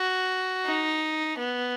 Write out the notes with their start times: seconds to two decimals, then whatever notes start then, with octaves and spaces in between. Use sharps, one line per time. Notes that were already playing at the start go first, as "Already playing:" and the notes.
Already playing: F#4
0.66 D#4
1.38 B3